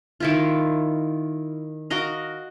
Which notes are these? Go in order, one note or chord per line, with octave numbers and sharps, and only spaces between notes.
D#3 E4 F4
F#4 A#4 D#5 F5